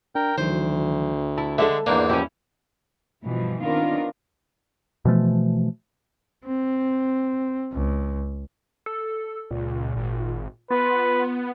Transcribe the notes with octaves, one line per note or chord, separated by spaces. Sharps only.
D4 A#4 G5
D2 D#3 E3 F#3 C5
E4 A5
D3 G#3 A4 E5
E2 G#2 A#3 D4
F3 C#4 E4 G4
G2 B2 E3 F3
D#3 B3 C4 D4 F4 A#4
B2 E3 F3 A3
C4
C#2
A4
C#2 A#2
G#1
B3 F4 B4